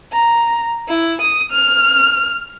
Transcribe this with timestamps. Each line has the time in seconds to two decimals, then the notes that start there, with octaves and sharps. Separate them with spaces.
0.12 A#5
0.88 E4
1.21 D#6
1.52 F6